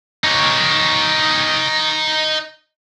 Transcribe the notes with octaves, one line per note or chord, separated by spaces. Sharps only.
D#4 C#5